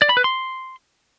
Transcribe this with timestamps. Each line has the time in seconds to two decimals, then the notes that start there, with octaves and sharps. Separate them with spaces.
0.02 D5
0.09 B5
0.17 B4
0.24 C6